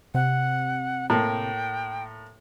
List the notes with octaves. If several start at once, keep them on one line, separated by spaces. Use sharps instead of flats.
C3 F#5
A2 A#3 G5